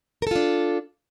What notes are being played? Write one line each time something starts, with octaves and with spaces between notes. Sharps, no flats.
D4 F4 A4 A#4